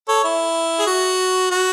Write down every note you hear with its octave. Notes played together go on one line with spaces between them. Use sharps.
A4 C#5
E4
G#4
F#4
F#4